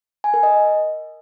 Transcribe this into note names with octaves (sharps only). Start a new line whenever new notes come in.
G#5
A#4
D#5